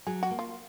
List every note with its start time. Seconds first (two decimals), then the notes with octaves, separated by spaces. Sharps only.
0.07 F#3 G#4
0.23 F#4
0.31 A#3
0.39 F4